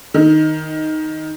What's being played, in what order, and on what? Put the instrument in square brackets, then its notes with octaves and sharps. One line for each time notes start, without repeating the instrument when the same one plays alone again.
[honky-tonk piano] D#3